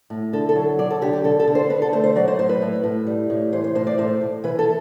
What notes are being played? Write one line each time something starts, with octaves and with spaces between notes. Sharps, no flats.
A2
D3 A4
A4
F#3
F#3 D5
A4
D3 G4
G4
D3 A4
A4
D3
C5
D3 B4
A4
A3 C5
C5
F#3 D5
C5
A2 C5
B4
A2
A2
G3
A2
E3 C5
C5
A2 C5
D5
A2 C5
A2
E3 B4
A4